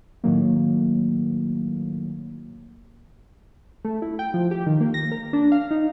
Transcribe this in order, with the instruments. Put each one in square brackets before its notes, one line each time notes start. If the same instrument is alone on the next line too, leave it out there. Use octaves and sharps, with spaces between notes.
[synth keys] A2 D#3 F#3 A#3
A3
E4
G5
F3
G4
D#3
A#3
A#6
A#4
D4
F5
D#4